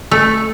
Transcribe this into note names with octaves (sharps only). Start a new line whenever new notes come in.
A3